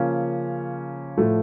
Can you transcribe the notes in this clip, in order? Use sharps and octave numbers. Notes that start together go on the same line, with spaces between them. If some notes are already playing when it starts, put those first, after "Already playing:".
Already playing: C#3 F3 A#3 C#4
A2 F3 A3